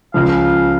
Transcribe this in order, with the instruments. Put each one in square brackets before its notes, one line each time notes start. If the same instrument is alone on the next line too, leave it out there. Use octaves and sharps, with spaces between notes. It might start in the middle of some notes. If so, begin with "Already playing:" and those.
[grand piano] C#2 C#3 F3 [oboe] F5